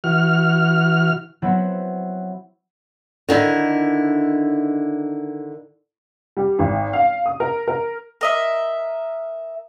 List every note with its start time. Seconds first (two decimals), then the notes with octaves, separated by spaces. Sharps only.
0.04 E3 F#4 F6
1.42 F#3 B3 C4 E4 E5 F#5
3.29 D3 D#3 E4
6.37 G3
6.59 G#1
6.93 F5
7.26 D#6
7.40 A#4
7.67 A#4
8.21 A#4 D#5 E5